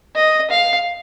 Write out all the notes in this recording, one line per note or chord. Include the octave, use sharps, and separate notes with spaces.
D#5
F5